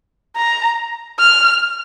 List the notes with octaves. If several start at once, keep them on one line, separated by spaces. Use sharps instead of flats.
A#5
F6